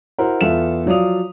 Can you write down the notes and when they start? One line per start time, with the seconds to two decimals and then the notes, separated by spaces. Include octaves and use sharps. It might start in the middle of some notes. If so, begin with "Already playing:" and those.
0.18 E4 F#4 A#4 C5 F#5
0.41 E2 B3 F4 A4 E5 E7
0.86 F3 F#3 D5 F5 D#6 F7